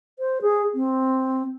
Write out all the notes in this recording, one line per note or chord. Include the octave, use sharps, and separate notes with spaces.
C5
G#4
C4